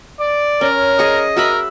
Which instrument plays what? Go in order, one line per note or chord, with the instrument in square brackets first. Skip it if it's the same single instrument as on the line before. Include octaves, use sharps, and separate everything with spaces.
[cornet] D5
[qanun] C#4 [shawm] A#4
[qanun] G#4 C#6 [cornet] D#5
[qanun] F#4 E5 B5 [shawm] A#4